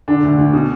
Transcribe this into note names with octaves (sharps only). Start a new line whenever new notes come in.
D3 D4
D2
D2
B2